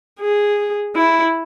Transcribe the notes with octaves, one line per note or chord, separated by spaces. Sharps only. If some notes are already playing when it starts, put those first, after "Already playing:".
G#4
E4